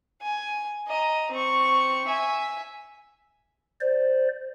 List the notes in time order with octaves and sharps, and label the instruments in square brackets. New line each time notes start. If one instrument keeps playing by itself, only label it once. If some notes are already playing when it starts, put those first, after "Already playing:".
[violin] G#5
D#5 A#5
C4 C#6
E5 G#5
[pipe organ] C5 D5